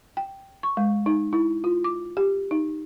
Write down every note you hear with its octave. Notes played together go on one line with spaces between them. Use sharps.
G5
C#6
G#3
D#4
E4
F4
D6
G4
D#4